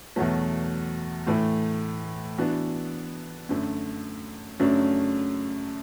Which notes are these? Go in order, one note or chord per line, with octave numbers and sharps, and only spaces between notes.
E2 B2 F#3 A3
A2 E3 A3
E3 B3 D4 F#4
F#2 D3 A3
F#2 C#3 F#3 A3 D4